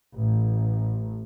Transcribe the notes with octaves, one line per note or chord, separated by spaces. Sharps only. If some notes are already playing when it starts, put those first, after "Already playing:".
A1